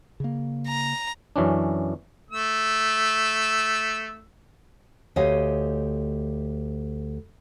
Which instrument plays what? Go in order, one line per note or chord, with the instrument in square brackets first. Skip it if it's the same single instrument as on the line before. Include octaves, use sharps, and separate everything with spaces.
[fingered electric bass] C#3 A#3
[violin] A#5
[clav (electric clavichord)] F#2 E3 C#4 D4
[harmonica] A3 E6
[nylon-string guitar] D2 G4 C#5 D#5 F5 G#5